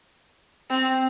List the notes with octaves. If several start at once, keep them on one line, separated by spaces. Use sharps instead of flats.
C4